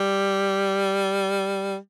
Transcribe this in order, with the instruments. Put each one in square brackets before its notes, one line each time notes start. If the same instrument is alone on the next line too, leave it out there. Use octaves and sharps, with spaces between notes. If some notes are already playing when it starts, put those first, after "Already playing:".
Already playing: [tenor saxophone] G3